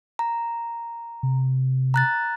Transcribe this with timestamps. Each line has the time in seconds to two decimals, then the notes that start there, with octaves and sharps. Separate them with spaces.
0.19 A#5
1.23 C3
1.94 A#5 F#6 A6